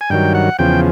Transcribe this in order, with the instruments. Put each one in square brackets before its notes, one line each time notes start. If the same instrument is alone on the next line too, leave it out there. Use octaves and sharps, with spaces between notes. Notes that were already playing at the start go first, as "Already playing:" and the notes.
[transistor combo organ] G#5
G2 D#3 F#3 G5
F#5
E2 C#3 F3 G5